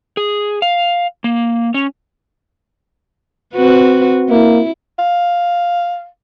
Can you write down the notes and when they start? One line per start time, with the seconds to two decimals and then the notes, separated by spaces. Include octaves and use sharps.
0.17 G#4
0.62 F5
1.24 A#3
1.74 C#4
3.54 C4 F#4 B4
4.29 A#3 E4
4.99 F5